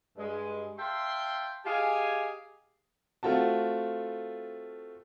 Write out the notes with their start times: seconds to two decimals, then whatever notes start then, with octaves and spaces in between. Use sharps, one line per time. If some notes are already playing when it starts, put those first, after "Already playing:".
0.18 G2 G#3
0.78 E5 F5 G5 A5 C6
1.66 G4 G#4 D#5 F5 G#5
3.23 A3 C4 F4 F#4 A5